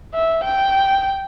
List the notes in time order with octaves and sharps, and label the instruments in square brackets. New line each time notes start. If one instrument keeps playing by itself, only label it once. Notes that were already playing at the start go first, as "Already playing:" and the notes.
[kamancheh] E5
G5